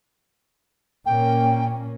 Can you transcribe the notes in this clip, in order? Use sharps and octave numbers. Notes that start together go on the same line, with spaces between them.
A#2 A#3 C#4 G5